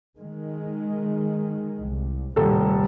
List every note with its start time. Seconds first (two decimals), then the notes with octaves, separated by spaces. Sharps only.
0.18 D#3 G#3
1.85 C2
2.36 D#1 A2 C3 G3 A4